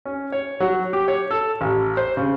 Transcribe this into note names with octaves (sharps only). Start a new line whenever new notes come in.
C#4
C#5
F#3
G4
C#5
A4
A1
C5
C#3